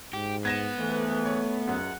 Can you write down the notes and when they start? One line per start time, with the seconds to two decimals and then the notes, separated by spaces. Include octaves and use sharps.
0.13 G#2 G4
0.45 B3 G#6 A#6 E7
0.78 F2 G#2 E3 A3
1.25 C#5
1.68 C#2 F#2 F#5